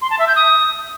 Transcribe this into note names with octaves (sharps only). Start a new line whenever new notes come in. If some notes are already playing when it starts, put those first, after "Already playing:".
C6
A5
E5
G6
D#6